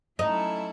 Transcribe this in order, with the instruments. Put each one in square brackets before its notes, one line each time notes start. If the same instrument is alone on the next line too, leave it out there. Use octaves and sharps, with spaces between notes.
[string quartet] F#3 A3 C#4 E4 A4 [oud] D#4